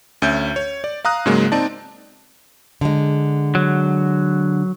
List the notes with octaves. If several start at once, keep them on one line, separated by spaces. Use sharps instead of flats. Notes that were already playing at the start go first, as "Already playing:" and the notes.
D2 C#4 E5 G6
C#5
D5
F5 A#5 D#6 F#6
G#2 C#3 F#3 G#3 A#3
C4 D#4 D5 A5
D3 G#3
F#3